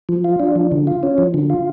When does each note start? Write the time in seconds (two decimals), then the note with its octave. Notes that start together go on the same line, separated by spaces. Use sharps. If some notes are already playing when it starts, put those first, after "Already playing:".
0.09 F3
0.24 F4
0.40 D4
0.56 F3
0.72 D3
0.87 F4
1.03 C#4
1.18 F3
1.34 D3
1.50 F4